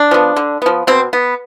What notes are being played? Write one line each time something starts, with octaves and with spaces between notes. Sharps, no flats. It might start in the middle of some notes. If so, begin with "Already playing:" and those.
Already playing: D4
F3 B3
D3
F3 B3
B2 C4
B3